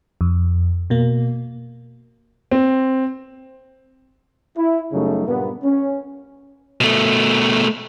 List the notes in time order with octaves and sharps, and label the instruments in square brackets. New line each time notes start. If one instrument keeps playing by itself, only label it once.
[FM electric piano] F2
B2 A#3
[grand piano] C4
[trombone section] E4
F#2 C#3 F#3 G3 A3 D#4
G2 A#2 A#3 B3
C#4
[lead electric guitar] B2 A3